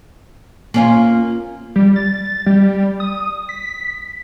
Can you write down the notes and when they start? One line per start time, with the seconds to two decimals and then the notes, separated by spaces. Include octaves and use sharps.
0.74 A#3 C#4 F4
1.76 G3
1.96 A6
2.46 G3
3.00 D#6
3.49 B6